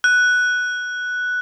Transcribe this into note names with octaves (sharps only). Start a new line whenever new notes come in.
F#6